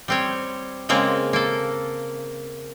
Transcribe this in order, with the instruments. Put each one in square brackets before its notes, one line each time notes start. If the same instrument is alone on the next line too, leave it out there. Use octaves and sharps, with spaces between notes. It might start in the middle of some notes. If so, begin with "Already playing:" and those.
[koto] G3 C4 C#5
C#3 G#3 A#3 C4 A#5
A#3 A4